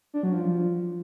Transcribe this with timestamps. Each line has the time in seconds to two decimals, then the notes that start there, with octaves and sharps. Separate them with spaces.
0.14 D4
0.23 F#3
0.33 F3